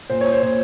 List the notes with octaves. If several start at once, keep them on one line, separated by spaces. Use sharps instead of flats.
A#2 C5
C#5
C5
A#2 C#5